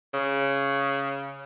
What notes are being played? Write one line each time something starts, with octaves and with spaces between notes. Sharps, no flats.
C#3